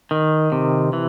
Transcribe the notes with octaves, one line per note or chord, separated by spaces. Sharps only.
D#3
C3
E3